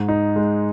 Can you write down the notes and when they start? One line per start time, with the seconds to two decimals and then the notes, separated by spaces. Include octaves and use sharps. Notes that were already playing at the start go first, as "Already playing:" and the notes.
Already playing: G#2
0.08 D#4
0.36 G#3